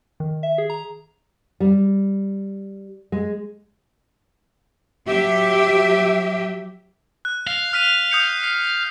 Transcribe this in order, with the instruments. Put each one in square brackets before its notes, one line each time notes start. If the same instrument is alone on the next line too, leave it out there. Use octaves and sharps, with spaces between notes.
[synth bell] D#3
E5
G#4
A#5
[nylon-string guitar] G3
G#3
[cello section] F#3 G4 E5
[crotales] F#6
[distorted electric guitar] F5
[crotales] F6 B6 D#7
D#6 G6 C#7
C7